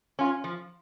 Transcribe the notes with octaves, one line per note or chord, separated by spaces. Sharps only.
C#4 F4
F3